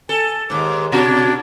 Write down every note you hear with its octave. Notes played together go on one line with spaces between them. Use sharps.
A4 G#5
D#2 G#2 D6
B2 D4 F#4